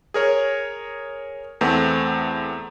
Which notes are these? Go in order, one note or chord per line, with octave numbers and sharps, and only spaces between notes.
G#4 A#4 C#5
E2 A3 B3 C4